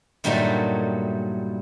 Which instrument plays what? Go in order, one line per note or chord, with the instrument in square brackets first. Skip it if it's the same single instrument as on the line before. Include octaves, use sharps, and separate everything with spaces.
[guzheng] G2 A#2 D#3 F#3 G3 A3